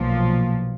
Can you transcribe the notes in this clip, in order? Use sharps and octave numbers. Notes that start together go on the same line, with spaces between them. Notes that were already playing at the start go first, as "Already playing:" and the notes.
Already playing: B1 A#2 F3